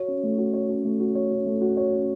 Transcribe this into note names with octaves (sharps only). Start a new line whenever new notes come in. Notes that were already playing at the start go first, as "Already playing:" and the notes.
Already playing: F#4 C#5
C#4
A3
F#4
C#5
C#4
A3
F#4
C#5
C#4
A3
F#4
C#5
C#4